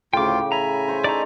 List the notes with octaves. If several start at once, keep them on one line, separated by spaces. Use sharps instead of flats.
D2 A2 C#3 F4 G5 D6
E5 G#5 A#5 B5
C5 C#5 C6
A3 D#4 G#4 D5 A#5